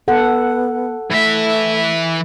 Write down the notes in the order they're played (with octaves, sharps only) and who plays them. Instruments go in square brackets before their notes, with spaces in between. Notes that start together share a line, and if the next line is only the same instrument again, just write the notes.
[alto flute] B3 [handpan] A4 F#5
[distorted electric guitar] E3 E5 [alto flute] A3